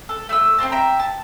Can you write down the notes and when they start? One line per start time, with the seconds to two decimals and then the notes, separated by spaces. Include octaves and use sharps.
0.09 A4
0.29 A3 E6
0.58 C4 E4 C5 A5
0.72 E5 G5 A#5
1.00 A5